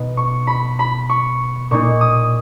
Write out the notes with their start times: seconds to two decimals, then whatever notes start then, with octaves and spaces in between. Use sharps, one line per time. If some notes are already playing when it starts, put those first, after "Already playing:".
Already playing: B2 B3 D#4
0.17 C#6
0.47 B5
0.79 B5
1.09 C#6
1.71 A#2 A#3 D#4 C#6
2.01 D#6